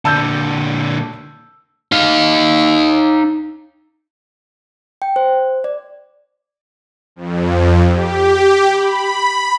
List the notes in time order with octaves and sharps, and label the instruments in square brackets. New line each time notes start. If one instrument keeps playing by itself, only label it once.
[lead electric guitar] A#2 D3 [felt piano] A5 E6 G6
[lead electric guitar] D#4 F5
[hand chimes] G5
C5
D5
[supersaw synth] F2
G4
B5